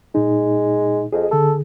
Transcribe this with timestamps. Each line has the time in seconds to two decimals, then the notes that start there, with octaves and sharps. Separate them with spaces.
0.15 A#2 G#3 D#4
1.13 F2 G#4 D#5
1.31 D3 G#4 A4